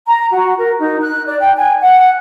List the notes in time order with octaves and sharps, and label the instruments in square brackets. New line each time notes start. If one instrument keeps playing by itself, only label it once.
[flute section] A#5
F#4
A#4
D#4
F#6
D5
G5
G#5
F#5